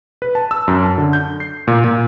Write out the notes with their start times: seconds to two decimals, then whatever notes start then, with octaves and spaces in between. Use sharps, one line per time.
0.22 B4
0.35 A5
0.51 E6
0.68 F#2
0.83 A5
0.98 D3
1.13 G6
1.40 C7
1.67 A#2
1.84 A#2